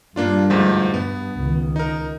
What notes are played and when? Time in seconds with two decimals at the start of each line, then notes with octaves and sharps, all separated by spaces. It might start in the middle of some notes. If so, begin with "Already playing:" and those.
0.16 G2 G3 A#3 D4 F4
0.50 D2 G#2 F3
0.94 G2 B3
1.39 C#2 D#3
1.76 D#4 A#4